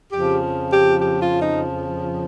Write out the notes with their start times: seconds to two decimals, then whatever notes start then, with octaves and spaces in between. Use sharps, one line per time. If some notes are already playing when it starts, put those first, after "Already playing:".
0.11 F2 C#3 F3 G4
0.69 G4
0.99 G4
1.20 F4
1.42 D#4